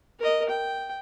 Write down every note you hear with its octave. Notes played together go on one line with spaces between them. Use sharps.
A#4 D#5
G5